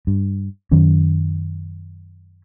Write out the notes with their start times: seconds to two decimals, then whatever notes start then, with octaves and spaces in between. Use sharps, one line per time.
0.07 G2
0.71 F#2 D#3 F#3 C#4